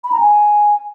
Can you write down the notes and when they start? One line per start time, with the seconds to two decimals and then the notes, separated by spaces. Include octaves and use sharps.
0.04 B5
0.12 A#5
0.20 G#5